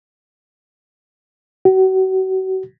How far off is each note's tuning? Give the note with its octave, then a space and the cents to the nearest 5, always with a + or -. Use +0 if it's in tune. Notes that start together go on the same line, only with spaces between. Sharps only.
F#4 +35